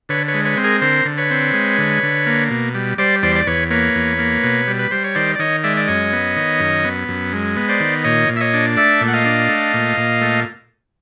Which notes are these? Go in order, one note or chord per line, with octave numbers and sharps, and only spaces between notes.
D3 B4 C#5
B4 C#5
G#3
B4 C#5
C4
G#4 A#4
D3 A#4 C5
D3
B4 C#5
C4
G#3
D3
D3
A#3
B2
G3
G3 C5 D5
E2 C5 D5
D5
E2 B4 C#5
A#3 B4 C#5
E2
A#3
B2
G3
B4
G3 C5
C#5
D#3 C5 D5
D5
D#3 C#5 D#5
G#3 D5 E5
D5
F#2 C#5 D#5
B3
D#3
F#2
B3
F#2
G#3
B3
C5 D5
D#3
A#2 C#5 D#5
A#2
E5
C#5 D#5
D4
A3 D5 E5
A#2
F#5
D#5 F5
D4
A3
A#2
A#2
A3